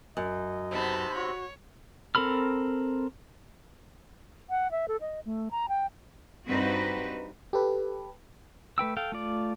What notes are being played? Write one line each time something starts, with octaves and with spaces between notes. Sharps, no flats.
F#2 D#5
C3 B3 D#4 A5 B5
F#4 C#5
C4 A4 A#4 B5 F6
F#5
E5
A4
D#5
A3
A#5
G5
G2 C4 D#4 F#4 B4
G4 A4 B4
A3 B4 G5 E6
A4 F5 G5
A3 F4 D5